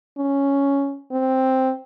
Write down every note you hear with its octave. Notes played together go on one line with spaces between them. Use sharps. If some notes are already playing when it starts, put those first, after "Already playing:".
C#4
C4